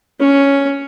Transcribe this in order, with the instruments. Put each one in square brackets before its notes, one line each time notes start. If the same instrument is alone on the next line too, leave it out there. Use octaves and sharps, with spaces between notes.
[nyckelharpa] C#4